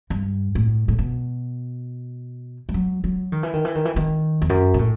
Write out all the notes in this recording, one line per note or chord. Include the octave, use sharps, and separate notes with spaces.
G2
A2
A2
B2
G3
F#3
F#3
D#3
E3
D#3
E3
D#3
E3
D#3
E2
F#2
B2
A2